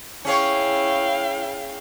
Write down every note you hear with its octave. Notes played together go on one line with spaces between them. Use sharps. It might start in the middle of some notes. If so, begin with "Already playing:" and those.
C#4 E4 G#4 C#5 F5 G5